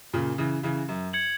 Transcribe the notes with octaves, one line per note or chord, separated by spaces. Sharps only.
A#2 C#3
C#3 E3
C#3 E3
F#2
G#6 C#7 F#7